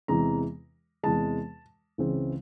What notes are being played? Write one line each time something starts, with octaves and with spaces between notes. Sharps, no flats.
E2 C3 E3 G#3 A#5
E2 C3 E3 G#3 A5
C#2 C#3 E3 G#3 C4